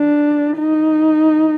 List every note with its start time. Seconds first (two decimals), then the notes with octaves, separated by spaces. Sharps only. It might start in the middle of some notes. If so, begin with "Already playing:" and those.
Already playing: D4
0.57 D#4